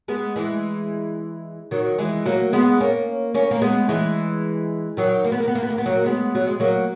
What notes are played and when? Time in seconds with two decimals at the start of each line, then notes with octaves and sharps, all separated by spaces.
0.08 G#3 B3
0.36 E3 G#3
1.71 D#3 F#3
1.98 E3 G#3
2.26 F#3 A#3
2.53 G#3 B3
2.80 A#3 C#4
3.34 A#3 C#4
3.51 A#3
3.61 G#3 B3
3.89 E3 G#3
4.97 D#3 F#3
5.24 A#3
5.32 B3
5.40 A#3
5.48 B3
5.55 A#3
5.63 B3
5.70 A#3
5.78 B3
5.86 F#3 A#3
6.06 G#3 B3
6.35 F#3
6.48 G#3
6.60 F#3 A#3